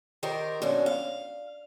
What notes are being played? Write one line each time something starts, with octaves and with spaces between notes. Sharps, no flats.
D#3 G4 A#4 C5
F#2 B2 C#4 D4
F5